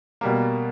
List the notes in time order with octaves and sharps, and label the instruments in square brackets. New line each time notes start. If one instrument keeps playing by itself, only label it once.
[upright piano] B2 G3 A#3